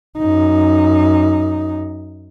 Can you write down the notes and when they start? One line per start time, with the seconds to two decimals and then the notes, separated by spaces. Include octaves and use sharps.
0.18 F#2 D#4